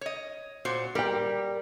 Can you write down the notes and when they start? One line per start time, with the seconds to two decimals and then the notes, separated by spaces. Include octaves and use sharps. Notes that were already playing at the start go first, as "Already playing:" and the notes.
0.01 C#5 D#5
0.65 A#2 F#4 C5
0.95 G3 A#4 G5